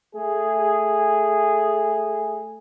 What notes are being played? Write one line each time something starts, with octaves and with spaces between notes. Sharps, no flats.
A3 G#4